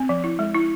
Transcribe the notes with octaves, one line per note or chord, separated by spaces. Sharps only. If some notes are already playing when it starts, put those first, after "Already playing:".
Already playing: C4
F3
E4
G#3
E4